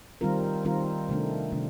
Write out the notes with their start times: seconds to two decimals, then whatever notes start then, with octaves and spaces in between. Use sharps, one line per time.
0.21 D#3 G3 C4 F4 A#4
0.65 D#3 G3 C4 F4 A#4
1.09 C3 D#3 A3 D4
1.52 C3 D#3 A3 D4